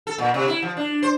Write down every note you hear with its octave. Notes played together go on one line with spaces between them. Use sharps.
A4
A#2
C3
E4
F3
D4
C5